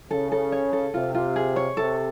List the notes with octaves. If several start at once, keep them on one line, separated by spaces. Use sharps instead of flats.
C#3 A4
A4
C#5
A4
C3 F4
F4
G#4
C#5
C3 A4